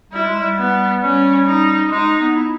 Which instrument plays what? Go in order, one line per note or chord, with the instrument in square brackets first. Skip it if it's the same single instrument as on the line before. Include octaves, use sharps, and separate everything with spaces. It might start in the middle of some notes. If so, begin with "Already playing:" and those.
[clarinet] G3 [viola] E4
[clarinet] G#3
G3
[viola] B3
[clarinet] G3 [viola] C#4
[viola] D#4
[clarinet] G#3 [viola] D#4
[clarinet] B3
E4